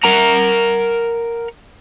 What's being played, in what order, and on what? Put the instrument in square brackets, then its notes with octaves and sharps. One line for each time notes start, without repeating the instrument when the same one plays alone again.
[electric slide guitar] A#4 F#5 A#5